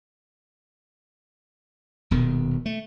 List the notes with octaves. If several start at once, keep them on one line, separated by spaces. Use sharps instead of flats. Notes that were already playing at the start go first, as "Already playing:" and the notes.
D#1 B2 D#3
A3